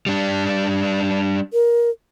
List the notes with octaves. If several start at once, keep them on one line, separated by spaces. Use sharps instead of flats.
G3 D4
A#4